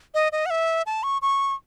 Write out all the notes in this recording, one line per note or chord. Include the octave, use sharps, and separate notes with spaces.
D#5
D#5
F#5
E5
A5
C#6
C#6